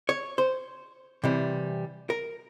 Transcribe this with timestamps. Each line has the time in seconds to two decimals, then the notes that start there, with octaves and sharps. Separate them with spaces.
0.09 C#5
0.38 C5
1.24 C3 E3 G3
2.10 A#4